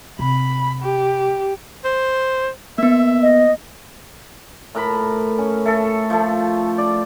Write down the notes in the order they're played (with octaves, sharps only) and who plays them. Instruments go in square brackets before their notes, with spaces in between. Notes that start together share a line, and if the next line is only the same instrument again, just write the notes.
[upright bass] C3 [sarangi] B5
[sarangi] G4
[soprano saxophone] C5
[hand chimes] A#3 B3 [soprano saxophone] E5
[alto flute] D#5
[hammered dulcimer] A2 A#4 B5
C#4
A3 A4
F3 A3
D5